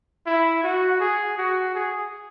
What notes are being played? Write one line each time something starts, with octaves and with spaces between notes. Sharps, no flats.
E4
F#4
G#4
F#4
G#4